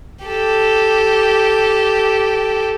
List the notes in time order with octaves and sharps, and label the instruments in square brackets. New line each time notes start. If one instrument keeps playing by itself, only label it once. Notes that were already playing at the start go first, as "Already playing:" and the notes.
[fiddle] G4 A4